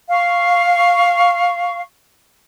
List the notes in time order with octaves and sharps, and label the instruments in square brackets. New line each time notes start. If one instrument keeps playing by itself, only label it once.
[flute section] F5 C#6